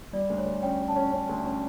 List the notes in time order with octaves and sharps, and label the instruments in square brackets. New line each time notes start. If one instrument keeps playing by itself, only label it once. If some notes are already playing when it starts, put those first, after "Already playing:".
[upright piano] G3 [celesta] D5
[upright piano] D2
[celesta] C#5
[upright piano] D2
[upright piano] C#4 [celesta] G5
[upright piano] C#4
[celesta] A5
[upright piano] C#4
C#4
D2
C#4